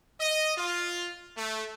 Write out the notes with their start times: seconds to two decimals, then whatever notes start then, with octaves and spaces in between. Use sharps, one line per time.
0.20 D#5
0.57 F4
1.37 A3